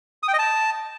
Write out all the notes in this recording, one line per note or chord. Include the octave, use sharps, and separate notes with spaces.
D#6
G5
D#5
A5